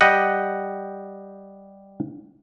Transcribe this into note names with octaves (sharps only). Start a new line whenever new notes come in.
G3 G4 D#5 F#5